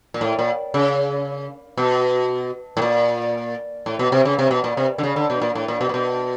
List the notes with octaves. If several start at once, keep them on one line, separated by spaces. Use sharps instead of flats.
A#2
A2
A#2
C#3
B2
A2
A#2
A2
B2
C3
C#3
C3
B2
A#2
C3
D3
C#3
D3
B2
A#2
A2
A#2
B2
A#2
B2